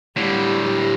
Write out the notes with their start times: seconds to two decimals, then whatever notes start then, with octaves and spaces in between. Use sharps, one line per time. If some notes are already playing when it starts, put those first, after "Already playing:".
0.17 A2 D3 G3
0.63 G4